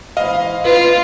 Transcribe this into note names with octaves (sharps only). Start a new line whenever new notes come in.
G#2 E3 E4 D#5 F5
F4 B4